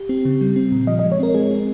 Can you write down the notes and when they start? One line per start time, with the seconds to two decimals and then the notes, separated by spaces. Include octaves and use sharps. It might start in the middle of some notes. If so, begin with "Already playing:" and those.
Already playing: G4
0.09 C4
0.25 C#3
0.41 G3
0.56 C4
0.72 A#2
0.87 F3 D#5
0.99 D#5
1.03 G#3
1.12 C#5
1.19 C4 A#4
1.34 G#3 G#4
1.51 C4